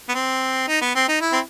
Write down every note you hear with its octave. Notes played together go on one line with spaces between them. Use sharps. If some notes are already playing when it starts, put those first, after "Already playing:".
B3
C4
D#4
B3
C4
D#4
E4
C4